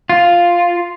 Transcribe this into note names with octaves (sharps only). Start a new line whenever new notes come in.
F4